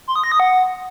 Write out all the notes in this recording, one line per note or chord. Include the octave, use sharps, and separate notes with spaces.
C6
D#6
A#6
D#6
F#5